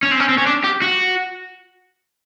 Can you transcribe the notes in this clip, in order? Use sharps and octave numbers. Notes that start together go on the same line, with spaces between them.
C#4
C4
C#4
C4
C#4
D4
G4
F#4